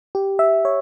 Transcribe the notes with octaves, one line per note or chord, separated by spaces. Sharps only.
G4
E5
C#5